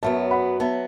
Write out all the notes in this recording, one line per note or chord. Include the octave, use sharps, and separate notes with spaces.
F#2 F#3 B3 E5 A5
F#5 B5
F#3 B3 E5 A5